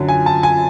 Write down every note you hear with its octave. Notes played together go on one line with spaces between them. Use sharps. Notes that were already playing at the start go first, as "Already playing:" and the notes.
Already playing: F#2 D3 F#3
G#5
A5
G#5